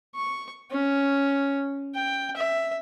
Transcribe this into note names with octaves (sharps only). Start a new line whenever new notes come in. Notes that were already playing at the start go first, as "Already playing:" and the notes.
C#6
C#4
G5
E5